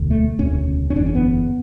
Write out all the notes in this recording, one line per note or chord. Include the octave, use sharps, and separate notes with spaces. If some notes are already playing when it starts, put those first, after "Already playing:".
Already playing: E1 D2 D3
A3
E1 D2 C#3 C#4
C#4
C#4
F#1 E2 D3 D4
C#4
B3